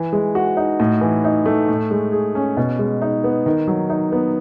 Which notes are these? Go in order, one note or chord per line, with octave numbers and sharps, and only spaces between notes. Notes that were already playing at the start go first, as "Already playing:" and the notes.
Already playing: E3
G#3
F#4
D#4
A2
E3
D#4
A3
A2
G#3
G#4
C#4
B2
G#3
D#4
B3
D#3
F#3
D#4
B3